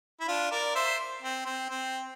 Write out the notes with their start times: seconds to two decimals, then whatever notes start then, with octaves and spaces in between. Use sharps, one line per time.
0.20 E4
0.28 D4 F4
0.51 A#4 D5
0.75 C5 E5
1.22 C4
1.45 C4
1.69 C4